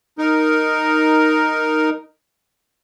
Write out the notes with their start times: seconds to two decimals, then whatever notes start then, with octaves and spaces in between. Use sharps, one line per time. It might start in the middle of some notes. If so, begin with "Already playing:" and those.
0.18 D#4 A#4